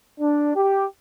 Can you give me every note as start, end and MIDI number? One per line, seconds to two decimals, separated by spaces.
0.20 0.52 62
0.55 0.84 67